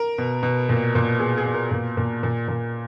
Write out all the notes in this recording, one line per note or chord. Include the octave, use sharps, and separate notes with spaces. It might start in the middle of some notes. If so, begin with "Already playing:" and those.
Already playing: A#4
B2
B2
A#2
A#2
B2 G#4
G#4
B2
A#4
A#2
A#2
A#2
A#2